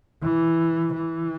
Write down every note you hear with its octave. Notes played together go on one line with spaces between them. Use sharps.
E3
E3